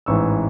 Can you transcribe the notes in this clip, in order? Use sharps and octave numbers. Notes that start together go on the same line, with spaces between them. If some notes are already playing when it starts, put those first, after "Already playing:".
A1 G#2 E3 C#6 E6